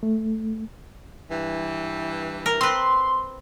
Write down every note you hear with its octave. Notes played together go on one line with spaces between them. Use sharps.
A3
G2 E3
A#4
C4 B4 C6